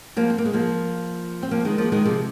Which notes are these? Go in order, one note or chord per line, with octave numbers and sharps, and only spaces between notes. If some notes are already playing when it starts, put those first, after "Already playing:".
F3 A#3
C4
A#3
G#3
F3 A#3
C4
F3 A#3
D#3 G#3
F3 A#3
D#3 G#3
C3 F3